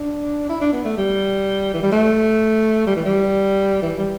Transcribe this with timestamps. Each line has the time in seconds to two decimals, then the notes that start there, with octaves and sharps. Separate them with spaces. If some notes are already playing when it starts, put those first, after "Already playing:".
Already playing: D4
0.49 E4
0.61 D4
0.73 B3
0.85 A3
0.97 G3
1.74 E3
1.83 G3
1.92 A3
2.87 G3
2.96 E3
3.05 G3
3.82 E3
3.98 G3